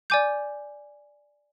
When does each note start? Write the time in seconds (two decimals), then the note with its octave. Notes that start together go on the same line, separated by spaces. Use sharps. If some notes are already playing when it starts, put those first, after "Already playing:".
0.10 D5 G#5 D6 G6